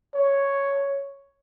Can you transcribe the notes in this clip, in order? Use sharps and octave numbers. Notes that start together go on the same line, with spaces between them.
C#5